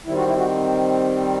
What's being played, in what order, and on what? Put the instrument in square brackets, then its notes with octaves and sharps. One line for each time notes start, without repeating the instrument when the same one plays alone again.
[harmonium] D#3 G3 C4 E4
F#4
E4
F#4